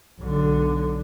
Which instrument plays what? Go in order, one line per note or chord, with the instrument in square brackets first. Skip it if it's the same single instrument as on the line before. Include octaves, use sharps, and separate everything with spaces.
[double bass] B1 D3